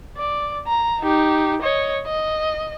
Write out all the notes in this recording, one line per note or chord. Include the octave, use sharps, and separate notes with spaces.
D5
A#5
D#4 G4
C#5 D#5
D#5